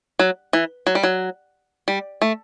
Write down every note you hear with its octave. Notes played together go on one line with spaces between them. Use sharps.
F#3
E3
F#3
G3
F#3
G3
A3